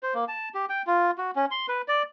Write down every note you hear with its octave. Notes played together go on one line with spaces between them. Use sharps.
C5
A#3
A5
G4
G5
F4
F#4
C#4
C6
B4
D5